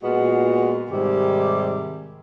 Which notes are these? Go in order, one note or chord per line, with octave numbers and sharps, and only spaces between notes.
A#2 G#3 B3 F4 F#4
G#2 C3 D#3 G3 G4